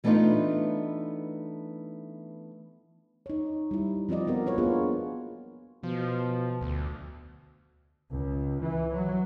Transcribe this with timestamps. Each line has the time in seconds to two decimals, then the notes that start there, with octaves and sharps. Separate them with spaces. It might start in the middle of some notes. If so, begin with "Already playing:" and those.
0.04 E3 A3 B3 D4 D#4 F4
3.26 D#4 C#5
3.71 G3 E4
4.09 F3 C4 F4 D5 D#5
4.28 B3 F#4 A#4
4.46 F4 B4 C#5
4.58 A#3 B3 D4 F4 F#4 G#4
5.83 B2 F3
6.61 D2
8.11 C#2
8.61 E3
8.93 F#3